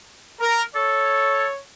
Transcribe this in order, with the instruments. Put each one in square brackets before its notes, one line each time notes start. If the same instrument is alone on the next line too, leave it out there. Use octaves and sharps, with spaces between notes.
[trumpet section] A#4
[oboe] A4 [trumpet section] C#5